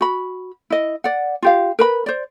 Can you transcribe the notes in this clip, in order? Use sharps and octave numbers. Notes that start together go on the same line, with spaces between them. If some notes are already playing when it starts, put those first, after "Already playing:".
F#4 B5
E4 D#5
D5 F#5
F4 G4 F5
A#4 B4 B5
C5 D5